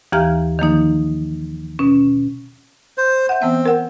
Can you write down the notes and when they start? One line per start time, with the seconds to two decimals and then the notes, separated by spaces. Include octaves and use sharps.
0.12 D#2 E3 G4 F5 A#5 F6
0.59 D#3 F3 A#3 D#4
1.79 B2 C#4
2.98 C5
3.29 E5 F#5
3.42 E3 B3 C4 E5
3.65 A#4 F#5